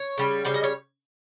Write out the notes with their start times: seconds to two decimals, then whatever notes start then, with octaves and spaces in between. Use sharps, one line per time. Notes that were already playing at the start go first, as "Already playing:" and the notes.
Already playing: C#5
0.18 C#3 G3
0.45 C#3 G3 C5
0.54 D#5
0.64 C#5